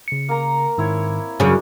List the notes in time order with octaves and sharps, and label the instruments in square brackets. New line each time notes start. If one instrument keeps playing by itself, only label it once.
[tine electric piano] C#3 C#7
[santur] A#3 A#4 A#5
[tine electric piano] G#2 D#3 [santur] C4 E4 C#5
[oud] F#2 C#3 [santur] D4 [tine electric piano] G#4 G#5